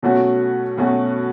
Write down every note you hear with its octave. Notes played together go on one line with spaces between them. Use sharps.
B2 F#3 A3 C#4 F#4
B2 F#3 A3 C#4 F#4